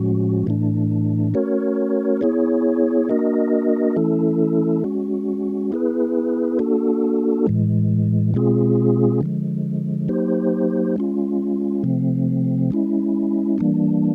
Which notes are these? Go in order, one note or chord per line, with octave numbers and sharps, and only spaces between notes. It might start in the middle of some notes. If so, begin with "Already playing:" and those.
Already playing: A2 F3 G#3 C#4 F#4
A2 E3 A3 D4
A3 C#4 F#4 A#4 C#5
B3 E4 G#4 C#5
A#3 D4 F#4 A#4 D#5
E3 A3 C#4 E4 A4
G#3 C#4 F#4
B3 E4 G#4 B4
A#3 D4 F#4 A4
A2 E3 G#3
B2 G#3 C4 F4 G#4
D3 F3 G#3
F#3 A#3 D#4 G4 C5
G#3 C#4 F4
C3 F3 A3 C4
G#3 C#4 E4
E3 G3 A#3 D4